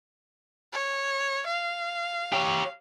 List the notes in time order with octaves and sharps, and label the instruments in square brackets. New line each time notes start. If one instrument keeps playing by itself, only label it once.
[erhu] C#5
F5
[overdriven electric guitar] G4 C#5